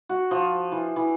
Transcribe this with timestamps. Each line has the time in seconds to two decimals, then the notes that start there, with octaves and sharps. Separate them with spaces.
0.09 F#4
0.31 F3
0.72 E3
0.96 E3